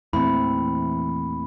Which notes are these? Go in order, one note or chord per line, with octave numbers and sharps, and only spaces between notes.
E2 A#2 E3 A3 C4 E4 B5